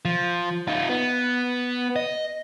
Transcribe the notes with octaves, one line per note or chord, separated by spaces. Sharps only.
F3
D#4 F4
B3
D#5